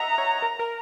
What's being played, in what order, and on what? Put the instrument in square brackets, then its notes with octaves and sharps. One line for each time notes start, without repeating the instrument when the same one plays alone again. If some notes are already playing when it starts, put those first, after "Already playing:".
Already playing: [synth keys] D#5 E5 F#5 [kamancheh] A#5
[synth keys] C#5
A#4
A#4